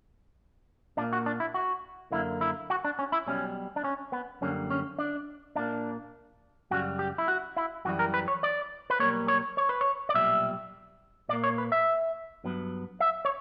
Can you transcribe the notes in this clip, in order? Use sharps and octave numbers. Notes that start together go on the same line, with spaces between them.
A#2 A#3 D4
F#4
D4
E4
F#4
F#2 D3 A#3 E4
E4
F#4
D4
C#4
E4
B1 B2 G3 C#4
D4
C#4
B3
F#2 D3 G3 A#3 C#4
C#4
D4
A#2 A#3 D4
F#2 C#3 G3 F#4
G4
E4
F#4
E4
F#2 E3 G3 F#4
A#4
B4
C#5
D5
B4
B1 B2 G3 A#3 C#5
C#5
C#5
B4
C#5
D5
B1 A#2 G3 E5
A#2 A#3 D5
C#5
B4
E5
G2 F#3 B3
E5
C#5